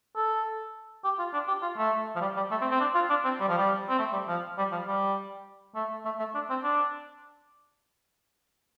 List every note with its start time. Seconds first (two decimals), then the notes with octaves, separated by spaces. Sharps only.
0.16 A4
1.04 G4
1.19 F4
1.33 D4
1.48 G4
1.62 F4
1.78 A3
2.16 F3
2.21 G3
2.36 G3
2.51 A3
2.61 C4
2.71 C4
2.80 D4
2.95 F4
3.10 D4
3.25 C4
3.40 G3
3.48 F3
3.57 G3
3.89 C4
3.99 A3
4.13 G3
4.28 F3
4.58 G3
4.72 F3
4.87 G3
5.75 A3
6.05 A3
6.19 A3
6.35 D4
6.50 C4
6.64 D4